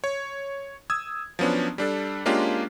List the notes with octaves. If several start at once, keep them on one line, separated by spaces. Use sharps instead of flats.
C#5
D#6 E6 G#6
F3 F#3 B3 C#4 D4
G3 D4 A4
G#3 A#3 C#4 D4 F4 G4